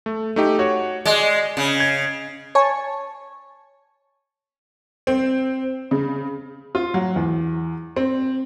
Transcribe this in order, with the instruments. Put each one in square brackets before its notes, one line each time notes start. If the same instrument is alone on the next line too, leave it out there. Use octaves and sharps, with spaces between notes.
[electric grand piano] A3
A3 D#4 G4
F#4 C#5
[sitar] G#3 [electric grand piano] D5
[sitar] C#3
[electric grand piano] G#6
[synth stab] C#5 G#5 A5 C#6
[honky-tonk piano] C4
C#3
[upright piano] F4
F#3
E2
C4